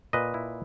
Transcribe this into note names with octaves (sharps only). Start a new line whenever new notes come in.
A#2 B4 D#5
E4